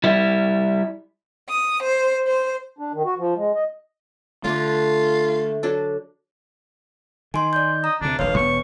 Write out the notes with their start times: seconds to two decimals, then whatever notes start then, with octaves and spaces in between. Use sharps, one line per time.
0.04 G3 E4
1.50 D#6
1.83 C5
2.27 C5
2.79 D4
2.93 D#3
3.05 F#4
3.19 F3
3.36 G#3
3.54 D#5
4.44 D3 A3 D4 F4
5.63 F#3 D4 A4
7.34 D#3 G#5 C6
7.53 D5 G6
7.84 D#5 A#5
8.01 D2 C3 D4
8.19 D#1 A#1 A#2 B4 C#5 F5
8.36 E1 D#2 B3 C#6